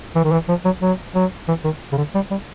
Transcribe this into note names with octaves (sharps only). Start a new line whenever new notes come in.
E3
D#3
E3
F3
F#3
F#3
F#3
E3
D#3
C#3
D3
G3
G3